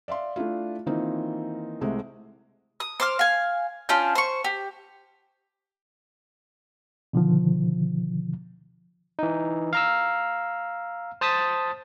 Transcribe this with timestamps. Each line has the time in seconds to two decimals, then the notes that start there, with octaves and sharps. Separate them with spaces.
0.08 D5 E5 F5 C6
0.36 A3 D4 E4 F4
0.86 D#3 E3 A#3 C4 D#4 F4
1.81 C2 C3 G#3 A3
2.80 D#6
3.00 C5 D6 F6
3.19 F5 G#5
3.89 C#4 D4 F4 G6
4.15 C5 C#6
4.44 G4
7.13 B2 D3 D#3 F3
9.19 E3 D#4
9.73 F5 A#5 E6
11.21 C5 A5 D#6 A6 B6